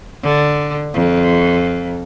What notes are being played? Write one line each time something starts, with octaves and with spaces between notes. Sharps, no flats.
D3
F2